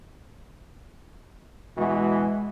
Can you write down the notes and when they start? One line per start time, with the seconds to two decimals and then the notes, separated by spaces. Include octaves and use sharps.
1.78 B2 E3 G#3 F#4